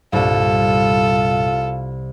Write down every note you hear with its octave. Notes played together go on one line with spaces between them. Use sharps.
C2 G2 A#2 G3 F4 A4